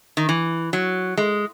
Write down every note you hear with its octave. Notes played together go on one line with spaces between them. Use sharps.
D#3
E3
F#3
G#3